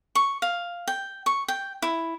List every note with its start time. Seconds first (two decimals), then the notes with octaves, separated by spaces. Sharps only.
0.15 C#6
0.42 F5
0.88 G5
1.26 C#6
1.48 G5
1.82 E4